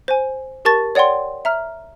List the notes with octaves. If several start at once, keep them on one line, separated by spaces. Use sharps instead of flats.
C5 G#5
G4 A#4 A5 C#6 A6
C#5 D5 F#5 G5 C6
E5 A#5 F6